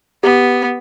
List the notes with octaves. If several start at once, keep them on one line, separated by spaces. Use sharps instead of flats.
B3 G4